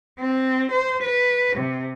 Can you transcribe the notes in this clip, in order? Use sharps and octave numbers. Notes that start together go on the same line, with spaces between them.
C4
C5
B4
C3